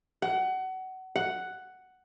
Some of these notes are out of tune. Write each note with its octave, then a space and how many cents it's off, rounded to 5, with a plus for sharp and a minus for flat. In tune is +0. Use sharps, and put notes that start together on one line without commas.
F#5 +25
F#5 +5